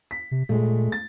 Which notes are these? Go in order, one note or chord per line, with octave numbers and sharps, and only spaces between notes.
B6
C3
A#2 G#3 A3
A6